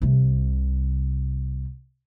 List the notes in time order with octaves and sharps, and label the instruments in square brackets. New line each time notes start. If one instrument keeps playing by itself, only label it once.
[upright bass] C2 C3